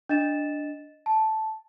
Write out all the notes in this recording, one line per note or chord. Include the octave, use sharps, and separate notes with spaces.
D4 D#5 A6 E7
A5